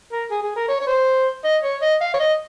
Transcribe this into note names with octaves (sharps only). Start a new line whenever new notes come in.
A#4
G#4
G#4
A#4
C#5
C#5
C5
D#5
C#5
D#5
F5
C#5
D#5